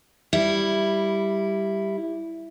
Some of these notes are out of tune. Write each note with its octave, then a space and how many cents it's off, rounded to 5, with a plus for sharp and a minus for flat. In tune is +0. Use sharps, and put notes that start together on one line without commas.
G3 +0 E4 +0